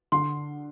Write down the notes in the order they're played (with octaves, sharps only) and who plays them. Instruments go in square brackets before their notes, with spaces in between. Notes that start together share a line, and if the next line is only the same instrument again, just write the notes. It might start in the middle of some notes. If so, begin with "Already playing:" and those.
[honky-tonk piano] D3 [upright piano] C6